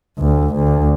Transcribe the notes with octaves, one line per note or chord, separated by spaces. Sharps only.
D2
D2